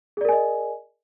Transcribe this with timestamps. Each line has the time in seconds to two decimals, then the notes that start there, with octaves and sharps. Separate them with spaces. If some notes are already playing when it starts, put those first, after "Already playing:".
0.17 G#4
0.21 D5
0.25 A#4
0.29 G#5
0.32 D#5